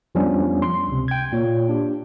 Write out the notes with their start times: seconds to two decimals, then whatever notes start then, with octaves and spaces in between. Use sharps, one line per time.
0.15 F2 F3 G3 B3 C#4 D4
0.62 C6
0.88 C#2 C3
1.08 G5 G#6
1.32 A#2 A#3 C#5
1.69 D4 G4